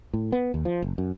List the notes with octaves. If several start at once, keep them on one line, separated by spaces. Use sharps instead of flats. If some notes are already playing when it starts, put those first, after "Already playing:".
A2
B3
D#2
F3
F#1
F#2